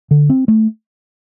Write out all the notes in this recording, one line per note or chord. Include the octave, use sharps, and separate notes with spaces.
D3
C4
A3